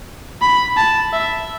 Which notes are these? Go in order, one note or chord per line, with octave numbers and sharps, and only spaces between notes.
B5
A5
E5